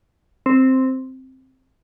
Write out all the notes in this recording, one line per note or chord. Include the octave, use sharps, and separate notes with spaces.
C4